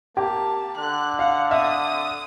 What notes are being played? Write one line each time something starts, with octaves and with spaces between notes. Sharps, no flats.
A#3 G4 A5
D3 F#6
F5 F#5
E5 D#6